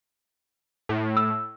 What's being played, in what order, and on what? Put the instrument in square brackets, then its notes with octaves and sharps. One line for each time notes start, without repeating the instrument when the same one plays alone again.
[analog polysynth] A2
[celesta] E6